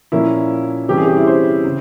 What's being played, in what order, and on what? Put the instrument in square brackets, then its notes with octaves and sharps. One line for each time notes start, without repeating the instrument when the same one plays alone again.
[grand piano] A#2 F3 A#3 C#4 E4
C3 E3 G3 C#4 G4
G#4
G4
E4
C5
C#3